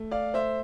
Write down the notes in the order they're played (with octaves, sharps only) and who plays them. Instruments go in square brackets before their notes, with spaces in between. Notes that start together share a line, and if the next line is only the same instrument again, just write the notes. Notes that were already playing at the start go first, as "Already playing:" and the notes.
Already playing: [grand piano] A3
D5 F5
A3 C5 E5